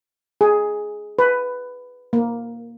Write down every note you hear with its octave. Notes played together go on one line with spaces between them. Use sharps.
G#4
B4
A#3